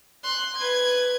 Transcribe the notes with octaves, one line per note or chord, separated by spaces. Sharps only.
C6 F#6
B4 G#6